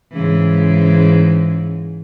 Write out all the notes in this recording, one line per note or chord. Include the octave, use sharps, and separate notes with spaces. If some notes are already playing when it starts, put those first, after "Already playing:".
G#2 C#3 E3